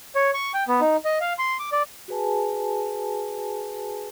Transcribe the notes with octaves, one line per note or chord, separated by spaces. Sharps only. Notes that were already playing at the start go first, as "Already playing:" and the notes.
C#5
C#6
G5
B3
D#4
D#5
F5
C6
D6
D5
F#4 G#4 B4 G#5 A5